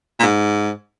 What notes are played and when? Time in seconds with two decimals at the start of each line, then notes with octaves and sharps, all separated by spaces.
0.19 A#2
0.22 G#2